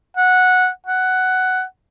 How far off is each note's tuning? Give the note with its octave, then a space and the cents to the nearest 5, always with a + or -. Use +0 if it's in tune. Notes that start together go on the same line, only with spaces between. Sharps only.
F#5 -10
F#5 +10